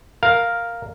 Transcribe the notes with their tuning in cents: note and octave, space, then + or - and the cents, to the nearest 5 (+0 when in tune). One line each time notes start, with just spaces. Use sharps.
A#4 +0 F5 +5